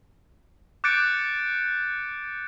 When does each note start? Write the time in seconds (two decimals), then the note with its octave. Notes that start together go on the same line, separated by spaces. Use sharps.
0.84 D6 F#6 G6 A6 C#7 D7